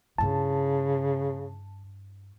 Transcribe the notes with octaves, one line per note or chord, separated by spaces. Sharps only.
G2 C#3 E4 A5